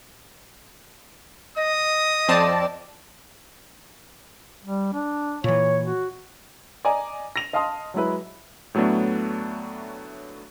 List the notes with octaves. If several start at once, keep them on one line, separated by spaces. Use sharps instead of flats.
D#5 D#6
F2 C4 D5 A5
G3
D4
A#2 E3 C#5
F#4
D5 D#5 G#5 A#5
A#6 F7
D#5 F5 A5 C6 D#6
F#3 G#3 E4 B4
A2 F#3 A3 B3 D4